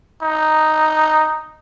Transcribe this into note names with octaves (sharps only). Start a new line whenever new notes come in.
D#4